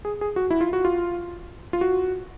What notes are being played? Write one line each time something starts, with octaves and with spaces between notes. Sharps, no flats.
G#4
G#4
F#4
E4
F4
F#4
F4
F4
F#4